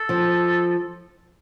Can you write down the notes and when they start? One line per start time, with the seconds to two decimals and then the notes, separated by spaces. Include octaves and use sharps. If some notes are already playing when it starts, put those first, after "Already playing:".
Already playing: A4
0.09 F3